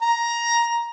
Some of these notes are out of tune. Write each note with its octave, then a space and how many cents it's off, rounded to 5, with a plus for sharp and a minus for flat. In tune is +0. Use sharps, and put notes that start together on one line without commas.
A#5 +10